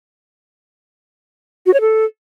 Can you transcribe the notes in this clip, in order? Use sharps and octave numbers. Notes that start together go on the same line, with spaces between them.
F#4
C#5
A4